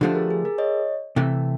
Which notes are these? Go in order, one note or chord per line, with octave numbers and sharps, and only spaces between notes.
D3 F3 A3 D4 G4 A4
G#4 A#4
G#4
G#4 A#4
C#5 D#5
C3 E3 A3